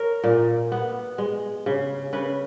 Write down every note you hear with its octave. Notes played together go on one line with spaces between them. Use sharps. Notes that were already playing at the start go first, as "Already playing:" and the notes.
Already playing: A#4 C#5
A#2
B3
G#3
C#3
C#3 B4